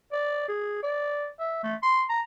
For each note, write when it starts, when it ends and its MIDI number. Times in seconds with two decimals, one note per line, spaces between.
0.12 0.46 74
0.48 0.80 68
0.83 1.27 74
1.39 1.63 76
1.63 1.75 57
1.83 2.04 84
2.09 2.21 82